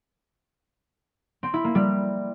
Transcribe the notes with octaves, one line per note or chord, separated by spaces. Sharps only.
C4
E4
A#3
G3